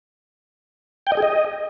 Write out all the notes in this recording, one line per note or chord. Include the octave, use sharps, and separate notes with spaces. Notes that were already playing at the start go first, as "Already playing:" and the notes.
G5
D#5
G#4
D#5